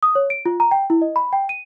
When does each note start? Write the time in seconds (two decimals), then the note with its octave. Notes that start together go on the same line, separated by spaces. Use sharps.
0.03 D#6
0.15 C#5
0.30 D7
0.45 F4
0.60 A#5
0.71 G5
0.90 E4
1.02 D#5
1.16 B5
1.33 G5
1.49 D#7